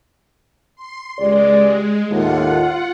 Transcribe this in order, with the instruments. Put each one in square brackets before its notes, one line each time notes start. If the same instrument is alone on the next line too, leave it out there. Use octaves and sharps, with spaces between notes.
[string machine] C6
[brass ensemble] C#2 G4 D5 [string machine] G#3
[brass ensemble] D#2 A2 [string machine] F4 F#5